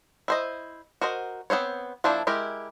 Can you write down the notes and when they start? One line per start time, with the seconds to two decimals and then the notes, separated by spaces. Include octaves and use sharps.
0.28 E4 C5 D#5
1.01 F#4 A#4 C5 D#5
1.50 B3 C4 C5 C#5
2.04 F3 A#3 D4 E4 C5
2.27 G#3 E4 G4 A#4